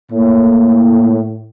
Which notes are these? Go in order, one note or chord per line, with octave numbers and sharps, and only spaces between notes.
A2 A#3